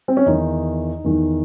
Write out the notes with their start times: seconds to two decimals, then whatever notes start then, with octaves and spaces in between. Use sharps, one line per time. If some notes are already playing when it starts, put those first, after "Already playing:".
0.08 C4
0.17 C#4
0.26 E2 D#3 D#4
1.04 E2 D#3